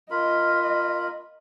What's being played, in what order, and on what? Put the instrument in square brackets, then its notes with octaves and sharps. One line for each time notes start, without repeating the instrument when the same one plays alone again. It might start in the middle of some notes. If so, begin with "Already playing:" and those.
[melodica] F4 A#4 B5 [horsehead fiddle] D#5